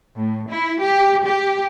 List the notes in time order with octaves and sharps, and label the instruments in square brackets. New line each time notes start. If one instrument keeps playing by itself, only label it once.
[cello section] A2
E4
G4
G4